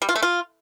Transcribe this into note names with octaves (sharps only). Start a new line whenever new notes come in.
G3
F4
A3
F4